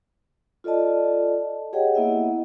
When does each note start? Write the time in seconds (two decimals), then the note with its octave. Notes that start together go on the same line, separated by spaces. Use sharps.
0.64 F4 A4 D5 D#5 A5
1.73 G4 G#4 C#5 D#5 F#5 G5
1.94 A#3 B3 E4 D#5 E5 F#5